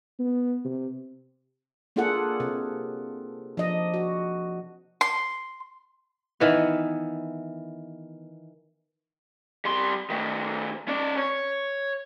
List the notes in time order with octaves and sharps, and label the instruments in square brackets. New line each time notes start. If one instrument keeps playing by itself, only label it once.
[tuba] B3
C3
[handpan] A#3 D4 F4 G#4 A4 F#5
C3
F3 D4 D#5
F#4
[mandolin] C6
[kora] D#3 E3 B3
[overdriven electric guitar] G3 C6
D#3 A3
C#4 D5
C#5